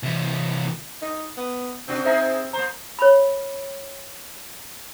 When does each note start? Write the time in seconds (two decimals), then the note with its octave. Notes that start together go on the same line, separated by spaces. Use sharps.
0.03 C3 E3
1.02 D#4
1.37 B3
1.88 C3 C4 D4 F#4
2.05 D#4 G#4 C5 E5 A#5
2.53 A#3 C5 A#5
2.99 C#5 B5